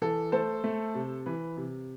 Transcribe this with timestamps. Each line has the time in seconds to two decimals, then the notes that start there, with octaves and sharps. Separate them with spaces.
0.02 E3 A4
0.32 A3 A4 C5
0.64 A3
0.95 C3
1.26 E3 B4
1.57 C3